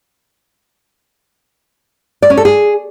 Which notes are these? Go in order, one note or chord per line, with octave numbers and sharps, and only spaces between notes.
D5
C#4
A4
G#4